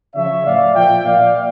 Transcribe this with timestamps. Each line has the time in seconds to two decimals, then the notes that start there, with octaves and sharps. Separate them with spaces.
0.15 C#3 F3 C#5 E5
0.45 A2 F3 D5 F5
0.75 A#2 F3 E5 G5
1.04 A#2 F3 D5 F5